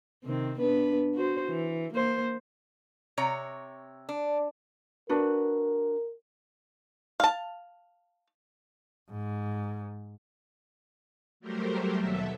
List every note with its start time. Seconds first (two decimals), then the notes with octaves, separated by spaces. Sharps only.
0.24 C3 D#3 C4
0.58 B3 D4 B4
1.15 F#4 C5
1.48 E3
1.93 A#3 C5
3.18 C3 C#5 A#5
4.09 D4
5.09 D4 F#4 A#4 B4
7.20 F5 A5
9.11 G#2
11.40 F#3 G3 A3 G4 A#4 C5
11.99 D#2 B2 F#3 A4 E5